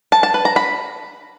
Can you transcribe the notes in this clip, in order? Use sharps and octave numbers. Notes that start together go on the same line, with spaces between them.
A5
A5
B4
A#5
B5